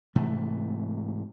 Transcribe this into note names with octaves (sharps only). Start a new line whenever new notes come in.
G#2 C3 E3 A3